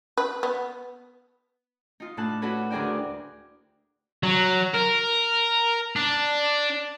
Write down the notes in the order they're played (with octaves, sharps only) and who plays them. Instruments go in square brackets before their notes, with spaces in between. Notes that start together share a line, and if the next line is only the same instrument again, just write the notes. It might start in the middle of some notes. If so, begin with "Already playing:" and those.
[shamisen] B4
B3
[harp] D#4 F4
A2 D4 A5 F#6
D4 E4 F#4 A4 B4 C#5
D2 D4 G#4 A#4 D5 G5
[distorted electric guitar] F#3
A#4
D4